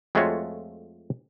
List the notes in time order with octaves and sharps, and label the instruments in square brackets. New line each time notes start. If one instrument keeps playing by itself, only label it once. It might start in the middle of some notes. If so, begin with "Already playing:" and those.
[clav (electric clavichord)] F2 G#3 A3 F4 F#4 C#5